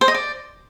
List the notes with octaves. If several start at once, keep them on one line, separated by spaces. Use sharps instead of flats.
C5
D#5
D5